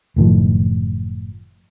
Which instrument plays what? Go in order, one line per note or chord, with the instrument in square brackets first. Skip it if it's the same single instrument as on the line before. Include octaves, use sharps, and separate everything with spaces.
[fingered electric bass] F#1 A2 D#3 F3